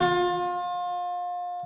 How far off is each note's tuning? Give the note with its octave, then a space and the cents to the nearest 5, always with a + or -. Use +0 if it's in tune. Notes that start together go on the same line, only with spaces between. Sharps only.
F4 +30